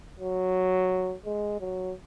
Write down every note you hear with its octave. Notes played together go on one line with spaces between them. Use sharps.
F#3
G#3
F#3